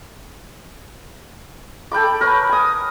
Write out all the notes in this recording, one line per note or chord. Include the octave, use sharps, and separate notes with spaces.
A4 G5 B5 D6
A#4 B4 C#5
G#5 D#6